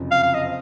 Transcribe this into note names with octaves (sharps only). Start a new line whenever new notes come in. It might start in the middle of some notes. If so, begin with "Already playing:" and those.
Already playing: F#1 F2 C3
F5
F5
D#5
C4